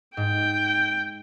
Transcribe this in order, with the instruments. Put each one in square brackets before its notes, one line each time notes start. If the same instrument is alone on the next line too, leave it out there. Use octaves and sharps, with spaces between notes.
[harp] G#2 [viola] G5